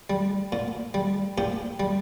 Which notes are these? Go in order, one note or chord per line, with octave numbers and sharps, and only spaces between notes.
G3
A#2
G3
A#2 G4
G3